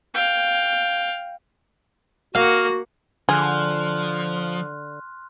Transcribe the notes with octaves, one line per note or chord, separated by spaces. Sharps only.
F5 G5
A#3 F#4 F5 F#5
D3 F3 G#4 C6 F6 F#6